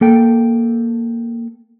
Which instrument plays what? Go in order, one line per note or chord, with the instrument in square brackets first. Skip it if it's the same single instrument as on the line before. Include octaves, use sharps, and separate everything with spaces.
[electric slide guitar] A#3 A4 G5